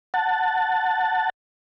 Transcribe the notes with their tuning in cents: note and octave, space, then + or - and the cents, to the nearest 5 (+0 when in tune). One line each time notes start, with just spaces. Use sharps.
F#5 +0 A5 +10